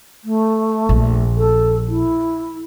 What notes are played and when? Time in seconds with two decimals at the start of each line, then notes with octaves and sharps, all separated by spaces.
0.24 A3
0.89 A#1
1.37 A4
1.88 E4